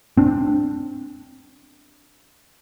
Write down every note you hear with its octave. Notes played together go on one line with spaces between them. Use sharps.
C4 D4